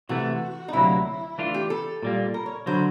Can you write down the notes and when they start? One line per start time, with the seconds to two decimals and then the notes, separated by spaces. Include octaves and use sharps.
0.09 C3 E3 A3 F#4
0.68 D#4
0.73 D2 C3 D#3 F#3 A#3 E4
1.38 E3 A3 D4 F4
1.54 G4
1.70 A4
2.03 A#2 G3 A#3
2.34 A#4
2.46 C#5
2.66 D3 F#3 C5